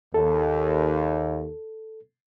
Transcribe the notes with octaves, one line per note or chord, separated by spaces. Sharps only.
D#2 A4